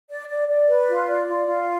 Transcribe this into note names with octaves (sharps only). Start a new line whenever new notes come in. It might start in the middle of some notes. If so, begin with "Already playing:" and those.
D5
D5
D5
B4
F4
D5
F4
F4